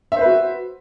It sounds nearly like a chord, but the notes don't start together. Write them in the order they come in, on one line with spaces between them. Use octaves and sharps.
E5 C5 B4 F#4